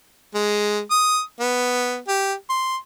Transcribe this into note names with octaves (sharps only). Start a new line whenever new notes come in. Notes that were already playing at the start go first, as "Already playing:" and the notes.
G#3
D#6
B3
G4
C6